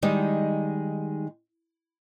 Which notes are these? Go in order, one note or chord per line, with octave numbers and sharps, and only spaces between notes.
D#3 G3 G#3 D#4